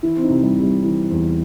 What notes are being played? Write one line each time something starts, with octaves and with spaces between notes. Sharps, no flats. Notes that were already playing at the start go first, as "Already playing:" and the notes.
E3 E4
C4
D#4
C3
G3
C3
G3
E3
E2